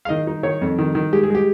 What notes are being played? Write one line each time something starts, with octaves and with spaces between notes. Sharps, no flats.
F5
D#3 D#5
D#4
D#3 C#5
F2
D#3
D#3
G#3 G4
G#4
G#3 G4